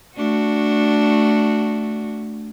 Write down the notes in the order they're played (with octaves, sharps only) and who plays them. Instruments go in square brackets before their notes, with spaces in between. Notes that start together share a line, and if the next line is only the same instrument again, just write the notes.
[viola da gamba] A3 D4 F#4